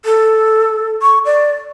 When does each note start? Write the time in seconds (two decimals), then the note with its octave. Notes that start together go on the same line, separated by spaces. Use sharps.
0.05 A4
1.02 C#6
1.25 D5